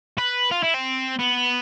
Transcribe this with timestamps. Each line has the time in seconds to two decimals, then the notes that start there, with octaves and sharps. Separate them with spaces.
0.18 B4
0.51 F4
0.63 E4
0.74 C4
1.19 B3